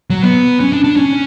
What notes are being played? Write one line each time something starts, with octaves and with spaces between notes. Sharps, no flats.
F#3
B3
C#4
D4
D4
C#4